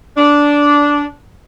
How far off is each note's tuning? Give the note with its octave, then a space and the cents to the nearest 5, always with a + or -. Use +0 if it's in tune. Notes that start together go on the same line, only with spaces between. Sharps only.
D4 -10